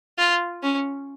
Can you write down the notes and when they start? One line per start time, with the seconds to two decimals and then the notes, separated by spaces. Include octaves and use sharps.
0.19 F4
0.63 C#4